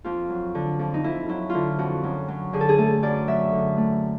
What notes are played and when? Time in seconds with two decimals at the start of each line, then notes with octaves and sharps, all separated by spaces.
0.04 F2 F4
0.29 F#3
0.55 D3
0.79 F2
0.94 D#4
1.04 F2 E4
1.28 F#3 E4
1.50 D3 E4 F4
1.78 F2 F#4
2.03 F#2
2.28 F#3
2.53 D3 G#4
2.61 A4
2.69 G#4
2.78 A3 A4
3.02 F#2 D5
3.27 F#3 E5
3.53 D3
3.77 A3